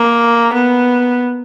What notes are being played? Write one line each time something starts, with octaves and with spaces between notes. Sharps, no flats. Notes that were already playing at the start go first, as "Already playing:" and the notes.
Already playing: A#3
B3